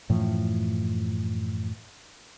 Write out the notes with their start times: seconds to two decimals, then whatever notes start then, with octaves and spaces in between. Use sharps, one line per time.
0.09 F#2 A2 E3 F3